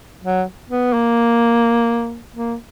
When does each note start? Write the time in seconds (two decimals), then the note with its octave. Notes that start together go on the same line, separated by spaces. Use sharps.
0.23 F#3
0.69 B3
0.93 A#3
2.35 A#3